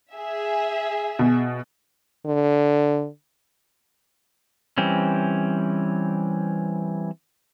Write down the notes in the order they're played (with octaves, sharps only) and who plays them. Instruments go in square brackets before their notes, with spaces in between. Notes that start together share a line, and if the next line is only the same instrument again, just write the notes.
[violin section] G#4 E5
[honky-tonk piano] B2
[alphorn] D3
[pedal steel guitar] E3 G3 C4 C#4